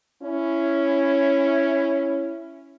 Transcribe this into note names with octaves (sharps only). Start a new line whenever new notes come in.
C#4 E4